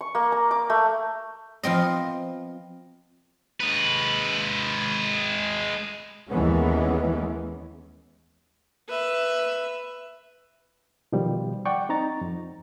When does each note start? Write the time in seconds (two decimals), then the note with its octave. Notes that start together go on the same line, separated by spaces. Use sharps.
0.01 C#6
0.15 A#3
0.32 A#5
0.51 D6
0.70 A3
1.63 F3 B3 C4 D#5
3.61 G#3 B4
6.30 D#2 E3 G#3 B3 C#4
8.89 B4 E5
11.12 B2 D#3 F3 G3
11.65 D5 F#5 G5 C#6
11.89 C4 D#4 A#5 A6
12.21 F2